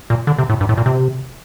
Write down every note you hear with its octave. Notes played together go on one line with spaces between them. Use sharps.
A#2
D3
C3
A2
G2
A2
A#2
C3